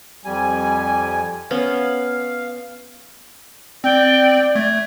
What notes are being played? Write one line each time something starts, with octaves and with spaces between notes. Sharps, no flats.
F2 G3 G#5
B3 C#4 F5
C4 D5 G5
A3 G#6